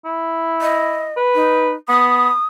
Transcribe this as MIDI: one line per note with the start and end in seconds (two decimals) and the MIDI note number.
0.05 1.08 64
0.62 1.15 75
1.17 1.71 71
1.35 1.75 63
1.89 2.30 59
1.89 2.45 87